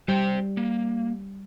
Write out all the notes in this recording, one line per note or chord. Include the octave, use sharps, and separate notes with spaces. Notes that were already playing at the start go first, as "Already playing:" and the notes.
G3 G4 C5 G5
A#3